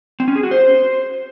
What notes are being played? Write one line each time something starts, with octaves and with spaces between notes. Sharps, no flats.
C4
C#4
G#4
F#4
C5